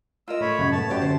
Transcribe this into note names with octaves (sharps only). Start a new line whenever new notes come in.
F4 A#4 D#5 E6
A3 C#5 B5
F#2 C#3 G#6
A3 B3 A5
F#2 G4 C#5 D5
D3 C5